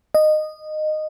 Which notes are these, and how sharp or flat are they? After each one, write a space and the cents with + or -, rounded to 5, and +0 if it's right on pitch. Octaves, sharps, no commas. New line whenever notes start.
D#5 -15